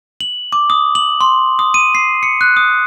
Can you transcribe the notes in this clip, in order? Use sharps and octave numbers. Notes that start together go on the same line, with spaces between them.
F#7
D6
D#6
F#7
C6
D#6
D#7
C7
C#7
F#6
D#6